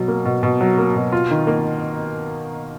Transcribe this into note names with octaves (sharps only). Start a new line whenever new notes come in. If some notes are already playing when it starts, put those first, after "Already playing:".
Already playing: B2 F#3
A#3
B2
B2
F#3
A#3
B2
F4
D#3
A#3